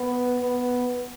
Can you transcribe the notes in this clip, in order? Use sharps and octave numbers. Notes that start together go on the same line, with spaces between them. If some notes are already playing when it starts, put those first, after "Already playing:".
Already playing: B3
B3